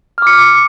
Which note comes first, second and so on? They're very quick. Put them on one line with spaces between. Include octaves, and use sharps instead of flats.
F6 D6 C#7